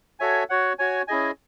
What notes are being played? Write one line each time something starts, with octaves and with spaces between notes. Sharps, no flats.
F#4 A4 C#5 E5 G#5
F#4 C#5 F#5
F#4 C#5 G#5
C#4 E4 G#4 D#5 G#5